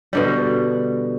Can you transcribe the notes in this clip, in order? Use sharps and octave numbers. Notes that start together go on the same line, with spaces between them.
B2 D3 G3